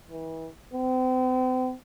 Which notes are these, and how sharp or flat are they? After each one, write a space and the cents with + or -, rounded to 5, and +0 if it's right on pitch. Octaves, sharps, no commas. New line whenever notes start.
E3 -30
C4 -40